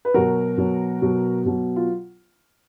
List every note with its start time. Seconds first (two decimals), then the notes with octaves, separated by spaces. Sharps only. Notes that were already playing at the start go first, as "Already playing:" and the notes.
0.05 B4
0.14 B2 F#3 F#4 A#4
0.58 B2 F#3
1.02 B2 F#3
1.46 B2 F#3
1.76 F4